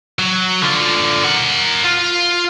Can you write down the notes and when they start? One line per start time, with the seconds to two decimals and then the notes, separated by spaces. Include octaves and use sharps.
0.19 F#3
0.62 D3 F4
1.24 A#4 F#5
1.84 F4